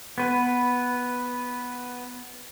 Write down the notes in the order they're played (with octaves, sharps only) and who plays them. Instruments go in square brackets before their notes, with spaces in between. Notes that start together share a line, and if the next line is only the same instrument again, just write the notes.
[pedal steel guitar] B3 B4